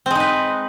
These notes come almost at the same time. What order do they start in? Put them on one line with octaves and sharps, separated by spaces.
C4 G#3 D#4 B4